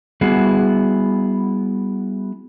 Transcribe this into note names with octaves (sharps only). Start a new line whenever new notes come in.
G3 B3 E4 F#4 G#4